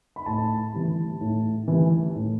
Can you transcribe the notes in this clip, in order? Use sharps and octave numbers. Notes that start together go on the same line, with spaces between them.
B5
A2 A5
E3 G3
A2
E3 G3
A2